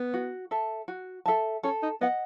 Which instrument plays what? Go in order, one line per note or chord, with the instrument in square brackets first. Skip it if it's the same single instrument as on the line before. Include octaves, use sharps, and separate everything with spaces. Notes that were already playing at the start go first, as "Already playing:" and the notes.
Already playing: [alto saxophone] B3
[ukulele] F#4
A4 E5 A5
F#4
A4 E5 A5
[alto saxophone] C#4 [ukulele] A4
[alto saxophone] D#4
[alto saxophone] B3 [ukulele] D#5 F#5